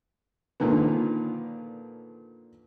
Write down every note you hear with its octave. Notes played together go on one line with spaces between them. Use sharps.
A#2 D3 D#3 F3 B3